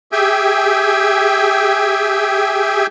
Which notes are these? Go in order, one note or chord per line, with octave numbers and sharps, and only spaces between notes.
G4 G#4 E5 G5 G#5